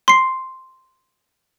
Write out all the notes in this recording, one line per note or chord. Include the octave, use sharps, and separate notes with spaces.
C6 C7